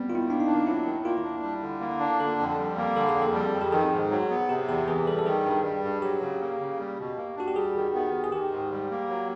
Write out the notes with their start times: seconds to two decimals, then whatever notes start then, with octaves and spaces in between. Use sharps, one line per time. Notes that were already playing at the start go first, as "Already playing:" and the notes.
Already playing: G3 B3 C4
0.09 D#3 F4
0.15 E4
0.28 A#3 D4
0.40 D#4
0.47 D4
0.67 F#3 E4
0.85 D#3
1.05 A#3 F4
1.23 D4
1.42 G3
1.62 D3
1.81 A#3
2.00 D4
2.20 D3 A4
2.39 F2
2.58 G3
2.77 A#3
2.96 D3 A4
3.09 G#4
3.15 F2
3.22 A4
3.34 G3
3.53 F2
3.61 G4
3.72 D#3 G#4
3.92 G#2
4.11 F#3
4.30 B3
4.49 C3 G4
4.68 E2 G4
4.87 E3 G#4
5.06 G3 A4
5.19 A4
5.26 D#3 G#4
5.45 G2
5.64 G3
5.84 G2
6.02 F#3 G4
6.21 C#3
6.41 A#3
6.60 C#3
6.79 G3
6.99 B2
7.17 A#3
7.36 D4 F#4
7.48 G4
7.56 G3 G#4
7.75 D#3
7.94 B3
8.14 D#3
8.24 G#4
8.32 D#3 G4
8.52 G#2
8.71 G3
8.91 A#3
9.09 F#3